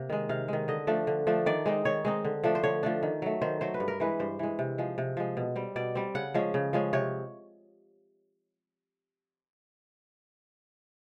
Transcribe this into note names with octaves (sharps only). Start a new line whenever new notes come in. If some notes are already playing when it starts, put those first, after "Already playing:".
Already playing: C3 A#3
D#3 G#3
C3 F5
D#3 G#3
D3 D#5
F3 A3 D4
D3
F3 A3 D4
D#3 D5
G#3 C4 D#4
D#3 C#5
G#3 C4 D#4
D3
F3 A3 D4
C5
D3 C#5
F3 A3 D4
D#3
F#3 A3
D#3 C5
F#3 A3 C5
B4
G2
A#4
E3 G#3 B4
G2 C5
E3 G#3
C3
F3 G#3
C3
F3 G#3
B2
G3 C4
B2 D5
G3 C4
C#3 F#5
F3 G#3 C#4
C#3
F3 G#3 C#4
C3 C#5